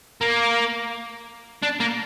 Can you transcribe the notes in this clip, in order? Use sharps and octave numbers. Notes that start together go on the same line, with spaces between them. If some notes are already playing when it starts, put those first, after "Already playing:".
A#3
D4
A#3